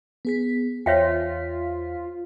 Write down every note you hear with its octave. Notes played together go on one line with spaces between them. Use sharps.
B3 G#4 B6
E2 F4 C5 C#5 E5 G5 B6